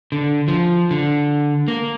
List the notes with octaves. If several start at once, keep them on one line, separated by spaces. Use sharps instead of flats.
D3
F3
D3
A#3